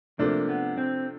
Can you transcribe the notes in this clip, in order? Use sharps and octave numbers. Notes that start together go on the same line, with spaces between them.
C3 F3 A3 A#3 D4
B3
C4